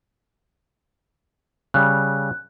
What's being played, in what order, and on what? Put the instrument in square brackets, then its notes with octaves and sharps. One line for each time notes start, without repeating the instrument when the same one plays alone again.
[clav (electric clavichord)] C#3 G3 [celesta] F#6